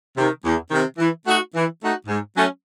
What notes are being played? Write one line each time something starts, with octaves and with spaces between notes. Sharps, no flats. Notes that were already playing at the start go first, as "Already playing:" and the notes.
C3 D#3
E2
C3 D#3
E3
A3 D#4 F#4
E3
A3 D#4 F#4
G#2
F#3 A3 C#4